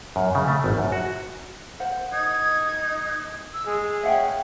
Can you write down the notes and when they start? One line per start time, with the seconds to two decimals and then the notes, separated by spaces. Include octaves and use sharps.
0.16 F#2
0.35 C#3
0.47 A3
0.64 G#1
0.77 F#2
0.92 F#4
1.79 A#4 C5 F#5
2.12 D#4 G#6
3.54 E6
3.66 G#3 G#4
4.03 C#3 E5 F#5 G5